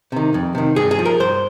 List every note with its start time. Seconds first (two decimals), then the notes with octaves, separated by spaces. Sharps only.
0.12 C3 D#3
0.34 F2
0.55 C3 D#3
0.76 G2 G#4
0.91 G#4
0.99 F3
1.05 A#4
1.20 G2 C5